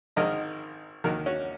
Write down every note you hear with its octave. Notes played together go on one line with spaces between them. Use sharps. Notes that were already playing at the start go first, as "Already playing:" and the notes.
G#1 G#2 D#3 A#4 D#5
D#2 D#3 F#4 A#4
C#4 F#4